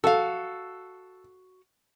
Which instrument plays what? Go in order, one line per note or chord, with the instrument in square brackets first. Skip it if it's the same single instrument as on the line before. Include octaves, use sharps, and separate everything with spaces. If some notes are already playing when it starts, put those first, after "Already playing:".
[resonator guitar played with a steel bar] F#4 F5 [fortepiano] A4